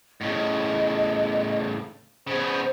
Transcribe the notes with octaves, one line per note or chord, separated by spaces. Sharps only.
A2 C#3 D#5
C#3 B3 C5